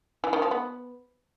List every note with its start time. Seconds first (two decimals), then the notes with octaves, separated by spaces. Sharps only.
0.24 E3
0.33 D#3
0.42 F3
0.51 B3